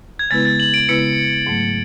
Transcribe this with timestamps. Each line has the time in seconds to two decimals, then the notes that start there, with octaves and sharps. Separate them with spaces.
0.19 G#6
0.31 C#3 G#3 B3 E4 B4 A6
0.45 A6
0.60 F#7
0.74 D7
0.89 C#3 G#3 B3 E4 B4 C#7
1.47 G#2 F#3 A3